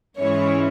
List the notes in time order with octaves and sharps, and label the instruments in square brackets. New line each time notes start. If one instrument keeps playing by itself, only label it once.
[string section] G#2 E3 G#3 C#4 E4 C#5